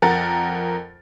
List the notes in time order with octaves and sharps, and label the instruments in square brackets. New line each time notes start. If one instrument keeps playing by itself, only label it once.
[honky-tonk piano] F2 A#4 F#5 A6